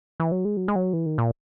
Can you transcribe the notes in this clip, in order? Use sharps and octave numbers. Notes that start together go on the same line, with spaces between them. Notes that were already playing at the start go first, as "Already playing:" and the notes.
E3
F#3
G#3
F#3
G#3
F#3
E3
D#3
A#2